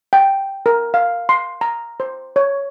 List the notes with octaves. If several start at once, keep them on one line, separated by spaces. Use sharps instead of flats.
G5
A#4
F5
C6
A#5
C5
C#5